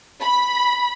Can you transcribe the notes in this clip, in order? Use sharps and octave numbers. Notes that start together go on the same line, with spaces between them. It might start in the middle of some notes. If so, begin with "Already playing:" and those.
B5